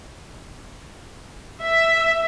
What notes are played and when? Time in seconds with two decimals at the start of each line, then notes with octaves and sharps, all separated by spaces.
1.60 E5